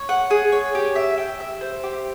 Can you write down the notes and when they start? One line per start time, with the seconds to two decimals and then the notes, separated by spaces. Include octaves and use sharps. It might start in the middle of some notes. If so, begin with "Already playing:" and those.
Already playing: C#5
0.09 F#5
0.31 G#4
0.52 C#5
0.75 G4
0.95 E5
1.18 G5
1.40 E5
1.61 C5
1.84 G4